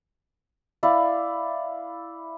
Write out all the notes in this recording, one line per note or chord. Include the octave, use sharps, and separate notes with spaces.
E4 D5 F5